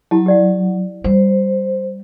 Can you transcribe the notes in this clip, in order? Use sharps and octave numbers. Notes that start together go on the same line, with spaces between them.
F#3 E4 G4 A5
G4 D5 F#5
G3 C5